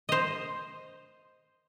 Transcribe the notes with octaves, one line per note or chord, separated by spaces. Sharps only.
C5 D#5